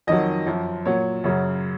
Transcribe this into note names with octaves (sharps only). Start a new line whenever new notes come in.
F2 D#3 F#3 D#5
F#2 F3
A#2 F#3 C#5
F#2 C#3 F#3